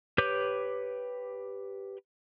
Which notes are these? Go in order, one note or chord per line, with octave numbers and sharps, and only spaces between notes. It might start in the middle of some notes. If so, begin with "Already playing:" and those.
G4 B4 C#5 D6 G6